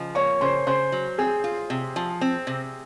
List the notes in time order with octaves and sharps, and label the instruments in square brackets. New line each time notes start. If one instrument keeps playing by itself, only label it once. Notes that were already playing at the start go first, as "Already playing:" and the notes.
Already playing: [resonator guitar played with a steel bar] C#3 F3 [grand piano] D#5
[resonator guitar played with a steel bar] A#3 [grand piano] C#5 C#6
[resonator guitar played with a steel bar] C#3 [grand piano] C5 C6
[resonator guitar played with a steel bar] C#3 [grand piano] C5 C6
[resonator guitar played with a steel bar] F#3
[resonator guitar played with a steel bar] C4 [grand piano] G#4 G#5
[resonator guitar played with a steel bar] F4
C3
F3
C4
C3